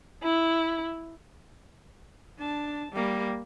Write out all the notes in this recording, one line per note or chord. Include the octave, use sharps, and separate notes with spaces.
E4
D4 A5
G3 A#3